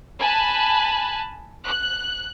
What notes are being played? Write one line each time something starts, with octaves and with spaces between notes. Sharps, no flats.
G#5 A5 B5 F#6
F#6